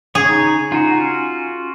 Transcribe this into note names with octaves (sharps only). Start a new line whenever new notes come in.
C#3 G#4 C#5
D#4
D#4 F4 F#4
C#4